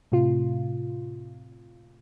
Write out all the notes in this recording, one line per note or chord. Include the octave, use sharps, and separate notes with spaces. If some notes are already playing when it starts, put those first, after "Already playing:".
A2 C3 F4